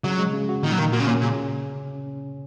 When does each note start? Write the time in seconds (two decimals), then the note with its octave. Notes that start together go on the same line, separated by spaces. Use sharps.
0.04 C#3 F#3
0.19 G#3
0.33 C#3
0.49 F#4
0.63 A#2 D#3
0.72 F#3
0.78 D#3 A#3
0.92 A#2 F#4
1.00 C#3
1.07 A#2 C#4
1.21 A#2 C#3